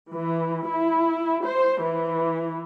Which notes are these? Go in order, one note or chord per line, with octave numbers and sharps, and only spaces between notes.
E3
E4
C5
E3